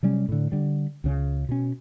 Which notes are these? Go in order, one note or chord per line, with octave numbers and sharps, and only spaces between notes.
C3 F#3 G3 C#4
A2 D3
D3 G3
C#2 C#3 C#4
B2 C#4